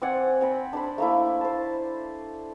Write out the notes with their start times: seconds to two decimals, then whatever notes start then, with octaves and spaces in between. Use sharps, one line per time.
0.02 C4 D5 F#5 G#5
0.41 C4 G5 B5
0.73 D4 C5 B5
0.98 A3 A#3 E4
1.41 C5 A5